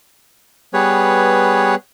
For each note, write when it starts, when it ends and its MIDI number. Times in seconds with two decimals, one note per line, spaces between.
0.73 1.75 55
0.73 1.75 59
0.73 1.75 68
0.73 1.75 71
0.73 1.75 73